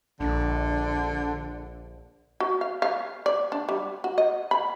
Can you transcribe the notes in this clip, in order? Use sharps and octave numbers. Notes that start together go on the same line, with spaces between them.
A#1 D3
F#4
F5
F5
D5
D4
G3
F#4
D#5
B5